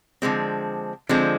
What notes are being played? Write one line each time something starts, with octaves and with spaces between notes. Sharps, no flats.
D3 F3 G#3 C4
D3 F3 G#3 C4